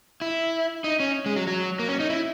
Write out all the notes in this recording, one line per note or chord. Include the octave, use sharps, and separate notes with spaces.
E4
D#4
C#4
G#3
F#3
F#3
A#3
C#4
D#4
E4